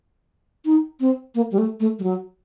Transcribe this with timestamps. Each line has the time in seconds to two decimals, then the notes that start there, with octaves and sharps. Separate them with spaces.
0.65 D#4
1.00 C4
1.35 A#3
1.52 G3
1.58 A3
1.80 A3
1.99 G3
2.03 F#3